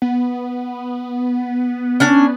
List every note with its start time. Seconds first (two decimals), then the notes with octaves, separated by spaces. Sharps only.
0.02 B3
2.00 C#4 D4 G#5